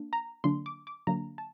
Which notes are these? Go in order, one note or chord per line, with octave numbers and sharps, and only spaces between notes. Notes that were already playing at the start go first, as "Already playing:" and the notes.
Already playing: A#3 D4
A#5
D3 F#3 A#3 D4 C6
D6
D6
D3 F#3 A#3 D4 A#5
A5